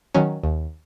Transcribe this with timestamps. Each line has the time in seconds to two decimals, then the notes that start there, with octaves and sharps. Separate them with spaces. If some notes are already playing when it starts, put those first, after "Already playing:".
0.14 D#3 F#3 C#4
0.44 D#2